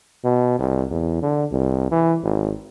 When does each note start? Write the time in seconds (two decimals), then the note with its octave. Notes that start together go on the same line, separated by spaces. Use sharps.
0.24 B2
0.59 C2
0.91 E2
1.22 D3
1.52 C2
1.91 E3
2.23 G#1